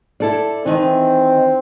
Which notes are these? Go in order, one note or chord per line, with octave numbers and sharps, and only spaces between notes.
E4 A4 D5
D#3 E3 C4